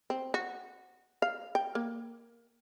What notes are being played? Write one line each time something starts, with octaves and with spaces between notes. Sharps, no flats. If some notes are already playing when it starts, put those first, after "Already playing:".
C4
F#4
F5
G5
A#3